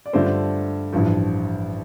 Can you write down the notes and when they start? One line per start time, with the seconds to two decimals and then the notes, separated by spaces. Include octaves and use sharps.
0.06 D5
0.13 G2 D3 A3 D4 F4 C5
0.92 A1 G2 F3